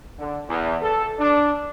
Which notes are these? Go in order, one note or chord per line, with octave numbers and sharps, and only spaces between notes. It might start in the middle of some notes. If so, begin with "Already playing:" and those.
D3
E2
A4
D4